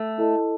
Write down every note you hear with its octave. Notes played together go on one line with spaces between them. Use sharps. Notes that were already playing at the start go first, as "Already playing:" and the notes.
Already playing: A3
E4 A4 D#5 A5